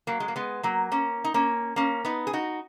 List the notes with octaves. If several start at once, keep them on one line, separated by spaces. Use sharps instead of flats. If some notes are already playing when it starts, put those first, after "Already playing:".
F#3 A#3
G#3
A#3
G#3 B3
F#3 A#3
A#3 C#4
D#4
A#3 C#4
A#3 C#4
B3 D#4
G#4
D#4 F#4